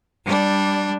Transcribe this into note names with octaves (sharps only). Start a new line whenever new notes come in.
G3 D4